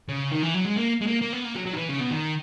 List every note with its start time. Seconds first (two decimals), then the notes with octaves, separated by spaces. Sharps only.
0.09 C#3
0.32 D#3
0.43 E3
0.54 F#3
0.65 G#3
0.76 A#3
1.01 G#3
1.07 A#3
1.21 A#3
1.33 B3
1.44 A#3
1.55 F#3
1.66 F#3
1.73 D#3
1.77 E3
1.89 C#3
2.00 B2
2.11 D#3